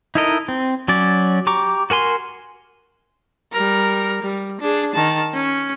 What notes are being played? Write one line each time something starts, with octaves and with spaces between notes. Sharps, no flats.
D#4 E4 A4 A#4 D#5
C4
F#3 C#4 D5
G4 A#5 C#6 D6
F#4 A#4 G#5 C6
G3 A#4
G3
D4 G#4
D#3 A5
C#4